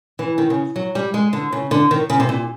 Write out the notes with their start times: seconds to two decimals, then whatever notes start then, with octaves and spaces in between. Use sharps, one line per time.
0.19 E3
0.38 D#3
0.50 C#3
0.76 F#3
0.95 G3
1.14 G#3
1.33 D3
1.52 C#3
1.71 D3
1.91 D#3
2.10 C#3
2.20 C3
2.29 A#2